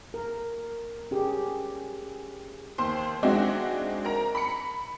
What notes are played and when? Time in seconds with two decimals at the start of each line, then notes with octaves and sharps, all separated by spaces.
0.14 A#4
1.11 C#4 G4 G#4
2.78 D#2 C5 C6
3.23 G#3 C4 D4 D#4 F#4 E5
4.05 A#4 A#5
4.35 B5 C#7